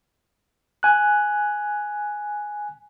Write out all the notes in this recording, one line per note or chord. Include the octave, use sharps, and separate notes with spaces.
G#5 F#6